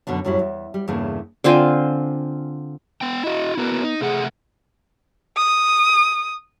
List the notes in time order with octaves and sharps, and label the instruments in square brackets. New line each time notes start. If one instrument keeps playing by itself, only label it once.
[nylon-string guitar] F#2 B2 D3 D4
F#2 A2 F#3 G3 E4
E2
G3
E2 G2 C#3 E3 A3 A#3
[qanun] D3 C4 F4 G#5
[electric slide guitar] B3 G5
[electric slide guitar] E4 F#4 [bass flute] D#5
[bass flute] B3 [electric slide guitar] E4 F#4 A#4
[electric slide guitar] D#4
[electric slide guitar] C3 A3 F#5 [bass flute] G#4
[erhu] D#6